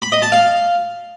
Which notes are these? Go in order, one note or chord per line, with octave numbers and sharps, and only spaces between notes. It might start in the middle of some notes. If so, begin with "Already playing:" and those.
B5
D#5
A5
F5